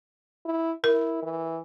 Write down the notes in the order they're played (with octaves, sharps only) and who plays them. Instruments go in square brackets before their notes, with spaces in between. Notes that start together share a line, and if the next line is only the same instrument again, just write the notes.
[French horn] E4
[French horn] E4 [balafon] A#4
[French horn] E3